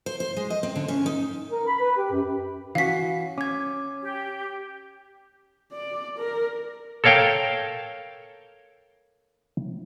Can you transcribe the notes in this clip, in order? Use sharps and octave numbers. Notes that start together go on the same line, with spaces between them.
C5
C5
G#3
D#5
C4
D3
C#4
D#4
A#4
B5
B4
G4
F#2
E3 C#4 F#4 F5 B6
C#4 D6 G#6
G4
D5
A#4
A4 A#4 C#5 F5 G5